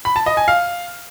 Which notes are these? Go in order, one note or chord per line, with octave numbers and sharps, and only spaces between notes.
B5
A5
D#5
G#5
F5